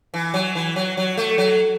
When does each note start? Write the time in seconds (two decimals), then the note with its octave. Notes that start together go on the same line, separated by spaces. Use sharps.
0.14 E3
0.34 F#3
0.55 E3
0.76 F#3
0.97 F#3
1.17 A3
1.38 F#3